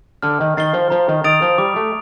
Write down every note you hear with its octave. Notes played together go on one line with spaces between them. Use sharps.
D3 F6
D#3
D#3 A6 C7 G7
F3
F3 A#5
D#3
D#3 D#6 A6 D7 F7
F3
G3 D6
A3